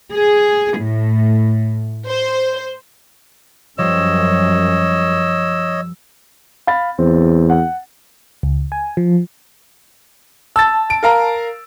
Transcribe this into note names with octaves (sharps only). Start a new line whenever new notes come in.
G#4
A2
C5
F#2 F3 G3 C5 C#5 D#5 E6
F5 B5 A6
E2 C4
F#5
C#2
G#5
F3
A5 E6 A6
D7
A#4 F5 A#5